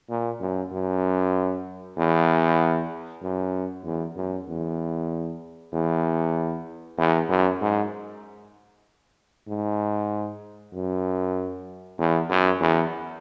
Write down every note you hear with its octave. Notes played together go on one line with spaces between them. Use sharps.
A#2
F#2
F#2
E2
F#2
E2
F#2
E2
E2
E2
F#2
G#2
G#2
F#2
E2
F#2
E2